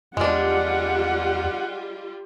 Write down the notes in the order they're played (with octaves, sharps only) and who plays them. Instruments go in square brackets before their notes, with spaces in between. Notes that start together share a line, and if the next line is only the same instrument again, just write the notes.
[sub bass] E2 [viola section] G3 F4 G4 [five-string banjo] G#3 D4 [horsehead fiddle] F#5